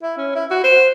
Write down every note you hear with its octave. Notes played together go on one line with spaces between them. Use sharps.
E4
C#4
E4
F#4
C5